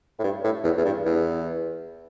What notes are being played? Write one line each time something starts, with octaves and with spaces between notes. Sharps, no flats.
A2
G2
A2
E2
E2
G2
E2